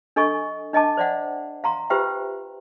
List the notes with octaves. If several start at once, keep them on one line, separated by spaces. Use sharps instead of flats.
D4 A4 D#5 G#5 C#6
D4 D#5 G#5 A5 D6
C5 D5 E5 F#5
F5 A#5 C6
F4 G4 B4 C5 E5 G5